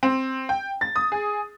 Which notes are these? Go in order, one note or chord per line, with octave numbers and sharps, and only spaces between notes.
C4
G5
A6
D#6
G#4